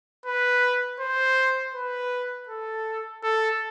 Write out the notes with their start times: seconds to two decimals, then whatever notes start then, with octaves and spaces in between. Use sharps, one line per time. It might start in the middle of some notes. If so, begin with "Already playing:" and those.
0.26 B4
1.00 C5
1.75 B4
2.49 A4
3.23 A4